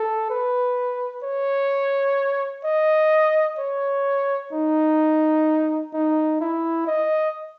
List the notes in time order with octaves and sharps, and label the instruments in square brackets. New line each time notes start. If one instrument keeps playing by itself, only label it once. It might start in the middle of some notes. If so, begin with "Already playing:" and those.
Already playing: [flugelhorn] A4
B4
C#5
D#5
C#5
D#4
D#4
E4
D#5